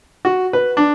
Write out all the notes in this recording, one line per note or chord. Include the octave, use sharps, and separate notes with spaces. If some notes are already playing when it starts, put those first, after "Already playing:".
F#4
B4
D4